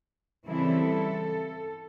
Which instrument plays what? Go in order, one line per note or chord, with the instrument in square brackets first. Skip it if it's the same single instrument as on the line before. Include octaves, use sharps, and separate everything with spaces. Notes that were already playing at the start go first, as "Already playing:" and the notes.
[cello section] C#3 E3 G3 C4 E4 A4